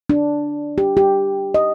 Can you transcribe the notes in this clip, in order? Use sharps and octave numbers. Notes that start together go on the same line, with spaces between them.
D4
G4
G4
D#5